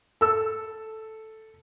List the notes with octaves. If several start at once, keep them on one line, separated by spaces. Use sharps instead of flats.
A4 E6